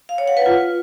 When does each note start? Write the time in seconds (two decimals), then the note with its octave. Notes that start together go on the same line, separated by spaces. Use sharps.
0.09 F5
0.18 C#5
0.28 F#5
0.37 B4
0.46 F4